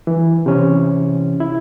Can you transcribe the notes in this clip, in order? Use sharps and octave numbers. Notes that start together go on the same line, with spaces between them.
E3
C3 E3 C#4
E4